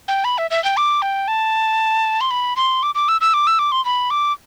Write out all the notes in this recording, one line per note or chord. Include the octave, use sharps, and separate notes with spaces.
G5
B5
E5
E5
G5
D6
G5
A5
C6
B5
C6
D6
D6
E6
E6
D6
E6
D6
C6
B5
D6